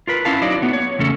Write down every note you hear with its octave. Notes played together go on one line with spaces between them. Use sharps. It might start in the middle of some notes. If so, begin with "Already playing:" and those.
F4 A#4 B4
C#4 E4 F5 A5
F#3 D#4 D5
A3 B3 F#4
C#5
E2 C#3 A3 C#4 A4